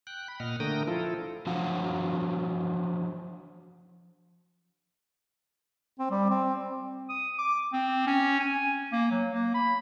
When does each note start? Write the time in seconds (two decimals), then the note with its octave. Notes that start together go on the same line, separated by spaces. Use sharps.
0.07 G5 F#6
0.28 B5
0.40 A#2 D#5 F#5 F6
0.60 D3 A3 A#4 G5 D#6 A#6
0.87 F3 E4 F4 A4
1.47 F3 F#3 D4 F#4 F5 F#5
5.99 C4
6.11 G3
6.30 C4
7.09 D#6
7.38 D6
7.73 C4
8.06 C#4
8.39 G#5
8.92 A#3
9.11 F#3
9.30 A#3
9.54 B5